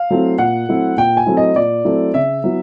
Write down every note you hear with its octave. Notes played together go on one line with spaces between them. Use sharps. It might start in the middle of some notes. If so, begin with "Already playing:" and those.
Already playing: F5
F#3 A3 C4 E4
A#2 F#5
F#3 A3 C4 E4
A#2 G5
G#5
F#3 A3 C4 E4
D#5
A#2 D5
F#3 A3 C4 E4
C#3 E5
F#3 B3 E4